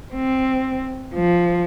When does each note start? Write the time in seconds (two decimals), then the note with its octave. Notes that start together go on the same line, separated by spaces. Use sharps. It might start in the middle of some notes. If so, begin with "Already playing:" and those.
0.14 C4
1.14 F3